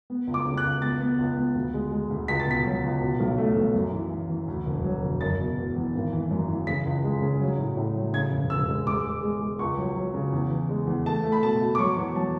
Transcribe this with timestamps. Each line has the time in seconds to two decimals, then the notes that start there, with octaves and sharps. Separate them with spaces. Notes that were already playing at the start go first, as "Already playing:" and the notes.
0.10 B3
0.27 C#2
0.34 D6
0.45 C#3
0.58 F#6
0.64 C#2
0.82 B3 A6
1.00 B3
1.19 C#2
1.37 B3
1.55 D2
1.74 G#3
1.92 G#3
2.10 D2
2.28 C#2 B6
2.40 A6
2.47 B2 B6
2.66 F#3
2.84 C#2
3.02 B2
3.20 B1
3.38 A3
3.56 B1
3.75 F#2
3.94 E3
4.11 E3
4.30 E3
4.48 D2
4.66 E1
4.84 F#3
5.03 E1
5.21 F#1 A6
5.39 B2
5.58 E2
5.76 E2
5.95 G#1
6.13 E3
6.31 F#2
6.49 E3
6.67 C#3 B6
6.86 C#2
7.04 G#3
7.22 C#3
7.40 F#3
7.58 A2
7.77 A2
7.95 F#3
8.13 C#3 G#6
8.32 E1
8.50 E1 E6
8.68 G#3
8.87 G#3 D6
9.05 G#3
9.23 G#3
9.41 G#3
9.59 C#2 C#6
9.78 F#3
9.96 F#3
10.14 C#3
10.33 E2
10.51 E2
10.69 G#3
10.87 E2
11.06 A3 A5
11.24 A3
11.32 B5
11.42 B2 A5
11.60 B2
11.75 D6
11.79 F#3 C#6
11.97 E2
12.16 F#3 A5